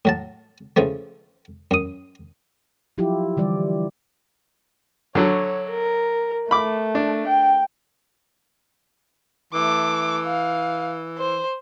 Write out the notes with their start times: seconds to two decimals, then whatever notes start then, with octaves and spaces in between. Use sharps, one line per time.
0.05 A2 F#3 A5
0.76 C#3 E3 F3 A3
1.71 F#2 D#6
2.98 F3 F#3 E4 F4 G4
3.37 D3 E3 G3 D5
5.15 D3 F#3 C#5
5.70 A#4
6.51 A3 B5 D6
6.95 D4
7.28 G5
9.53 E3 A3 D6
10.26 F5
11.18 C5